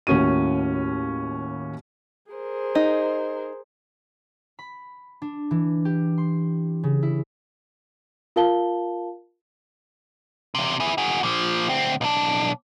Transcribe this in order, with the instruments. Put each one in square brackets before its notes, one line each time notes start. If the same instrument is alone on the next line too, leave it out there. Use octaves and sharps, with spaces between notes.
[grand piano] D#2 A2 A#3 C#4 F#4 D#7
[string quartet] G#4 A#4 C5
[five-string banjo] D#4
[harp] B5
D4
E3
G4
C6
C#3
E4
[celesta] F4 A#4 F5 A5 G7
[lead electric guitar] E2 C3
E4 G#4
F#4 G#4
A#2 F3
D2 C4
B1 D4